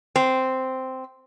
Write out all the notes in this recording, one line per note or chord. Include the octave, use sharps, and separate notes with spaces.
C4